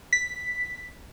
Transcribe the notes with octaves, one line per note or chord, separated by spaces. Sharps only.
B6